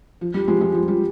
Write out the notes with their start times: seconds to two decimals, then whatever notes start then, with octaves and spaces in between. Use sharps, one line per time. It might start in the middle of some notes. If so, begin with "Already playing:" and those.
0.21 F3
0.34 G3
0.48 F3 G#3
0.60 F3 G#3
0.74 F3
0.88 G3